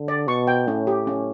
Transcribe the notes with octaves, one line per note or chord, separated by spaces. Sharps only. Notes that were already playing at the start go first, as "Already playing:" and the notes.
Already playing: D3
D5
B2 C#6
G5
A2 C#4
G4
C#4